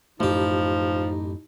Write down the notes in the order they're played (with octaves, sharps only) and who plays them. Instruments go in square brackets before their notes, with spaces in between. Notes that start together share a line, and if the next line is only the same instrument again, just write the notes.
[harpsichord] A1 G4 [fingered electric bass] F#2 A3 [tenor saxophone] F3 [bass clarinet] D#4